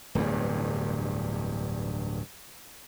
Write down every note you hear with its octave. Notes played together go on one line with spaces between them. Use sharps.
D1 E2 G2